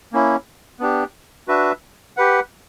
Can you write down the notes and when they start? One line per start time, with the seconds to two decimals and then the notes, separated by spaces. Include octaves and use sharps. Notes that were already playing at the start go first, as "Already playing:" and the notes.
0.13 A#3 C#4 E4
0.80 B3 D4 G4
1.48 D4 F#4 B4 E5
2.17 G4 B4 F#5